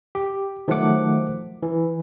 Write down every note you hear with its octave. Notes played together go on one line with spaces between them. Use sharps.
G4
D#3 F3 F#3 A3 F#5 D6
E3